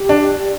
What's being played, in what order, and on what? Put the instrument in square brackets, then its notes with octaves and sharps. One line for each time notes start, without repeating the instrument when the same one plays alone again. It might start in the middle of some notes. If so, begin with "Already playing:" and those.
Already playing: [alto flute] G4
[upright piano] D4